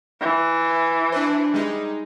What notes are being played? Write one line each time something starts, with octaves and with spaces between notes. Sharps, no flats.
E3
D4 B4 C5
G3 G#3 D#4